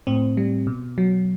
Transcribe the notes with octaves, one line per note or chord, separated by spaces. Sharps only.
A2 C4
G3
B2
F#3